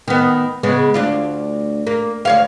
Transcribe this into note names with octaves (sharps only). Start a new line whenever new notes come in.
D#3 B3
C#3 G#3 B3
D2 D4 F4
A#3
D2 C#5 F5